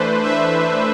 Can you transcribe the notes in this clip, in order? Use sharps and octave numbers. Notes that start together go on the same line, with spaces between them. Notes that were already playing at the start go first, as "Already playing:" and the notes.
Already playing: E3 A3 D4 B4 C5
E5